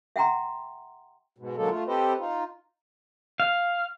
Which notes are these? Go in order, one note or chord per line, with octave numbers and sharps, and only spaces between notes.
E5 F#5 G5 A#5 C6
G#2 B2
D3 F#3 G#3 A#3 D#4 A4
A3 F4
C4 G4 A4 B4 C5 D#5
D#4 F4
F5